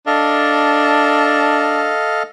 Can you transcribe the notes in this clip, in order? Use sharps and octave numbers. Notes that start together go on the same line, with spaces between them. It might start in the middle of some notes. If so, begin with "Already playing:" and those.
D4 A4 D#5 F5